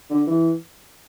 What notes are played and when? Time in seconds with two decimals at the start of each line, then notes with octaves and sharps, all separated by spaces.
0.10 D3
0.27 E3